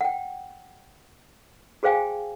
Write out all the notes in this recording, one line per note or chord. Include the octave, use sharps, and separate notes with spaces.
F#5 G5
F#4 G#4 C5 F5 G5 G#5